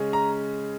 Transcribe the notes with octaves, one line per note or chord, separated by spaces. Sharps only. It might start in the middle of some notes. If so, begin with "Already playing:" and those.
Already playing: C#3 G#3 C#4
A#5